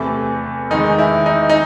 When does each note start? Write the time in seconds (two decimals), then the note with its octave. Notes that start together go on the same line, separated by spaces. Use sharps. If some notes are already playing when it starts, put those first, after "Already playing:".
Already playing: E2 C3 E3 A3
0.70 E2 D#3 G#3 D#4
0.98 E4
1.26 D#4
1.49 D#4